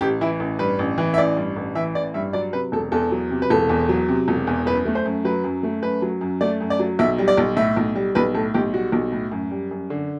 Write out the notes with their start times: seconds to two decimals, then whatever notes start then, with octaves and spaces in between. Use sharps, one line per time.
0.01 A1 G4
0.21 E3 E4
0.40 A1
0.59 G2 B4
0.79 A1
0.98 E3
1.14 E5
1.18 A1 D5
1.37 G2
1.56 A1
1.75 E3 E5
1.95 A1 D5
2.14 G2 E5
2.33 F#3 D5
2.53 C3 B4
2.72 E1 A4
2.92 E2 A4
3.12 F#3
3.31 C3
3.42 B4
3.50 E1 A4
3.69 E2
3.89 F#3
4.09 C3
4.28 E1
4.47 E2
4.66 F#2 B4
4.85 A3
4.95 C5
5.06 F#2
5.25 F#3 B4
5.44 F#2
5.63 A3
5.82 F#2 B4
6.02 F#3
6.21 F#2
6.41 A3 D5
6.61 F#2
6.70 D5
6.79 F#3
6.99 B1 E5
7.18 G3
7.28 D5
7.37 B1
7.57 A2 E5
7.76 B1
7.95 G3
8.15 B1 B4
8.35 A2 A4
8.54 B1 G4
8.74 G3 F#4
8.92 B1
9.12 A2
9.31 F#2
9.51 G3
9.71 F#2
9.90 D3